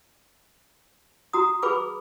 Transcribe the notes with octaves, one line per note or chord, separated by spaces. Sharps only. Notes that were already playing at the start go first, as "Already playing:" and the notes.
F#4 A#5 D#6
G#4 B4 B5 D6